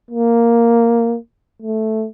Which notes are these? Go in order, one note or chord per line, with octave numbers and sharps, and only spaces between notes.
A#3
A3